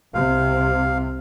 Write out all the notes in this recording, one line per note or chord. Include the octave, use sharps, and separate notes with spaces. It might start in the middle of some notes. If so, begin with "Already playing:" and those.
C2 C3 F5